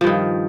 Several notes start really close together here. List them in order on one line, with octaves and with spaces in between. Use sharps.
F3 G2 D#3